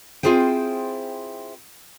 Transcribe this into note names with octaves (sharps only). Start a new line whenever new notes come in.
C4 E4 F4 G#4 C5 G5